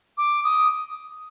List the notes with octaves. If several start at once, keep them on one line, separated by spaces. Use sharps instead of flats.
D6
D#6